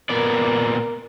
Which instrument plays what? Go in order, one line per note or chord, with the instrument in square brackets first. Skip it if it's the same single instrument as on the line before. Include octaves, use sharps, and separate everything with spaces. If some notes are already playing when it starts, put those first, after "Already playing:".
[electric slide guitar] A#2 B3 D5 [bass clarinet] A#4